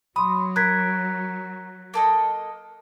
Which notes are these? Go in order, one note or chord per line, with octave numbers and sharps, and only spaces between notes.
F#3 B5 C6 D#6
A#4 F#6 G#6 B6
A#3 A4 D#5